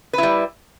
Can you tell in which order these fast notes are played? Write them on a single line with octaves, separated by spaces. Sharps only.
B4 E4 G3